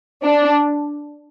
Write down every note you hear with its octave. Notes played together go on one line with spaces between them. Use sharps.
D4